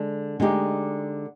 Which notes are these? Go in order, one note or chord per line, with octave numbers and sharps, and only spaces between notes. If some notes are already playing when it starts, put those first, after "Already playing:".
Already playing: D3 G#3
D3 G#3 D#4 G4